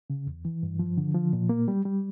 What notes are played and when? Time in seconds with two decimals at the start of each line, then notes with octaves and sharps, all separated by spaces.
0.10 C#3
0.27 E2
0.45 E3
0.63 G2
0.79 F3
0.98 D3
1.14 F3
1.33 A#2
1.49 A#3
1.68 G3
1.85 G3